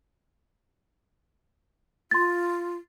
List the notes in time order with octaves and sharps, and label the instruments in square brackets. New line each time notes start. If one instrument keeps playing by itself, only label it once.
[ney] F4 [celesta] C6 A6